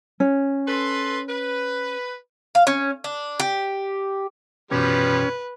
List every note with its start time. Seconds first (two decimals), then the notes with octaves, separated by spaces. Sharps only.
0.20 C#4
0.68 A4 B4 C6
1.29 B4
2.55 F5
2.67 C#4
3.04 D4
3.40 G4
4.71 F#2 B2 E3 F3 G3 C#4 G4 B4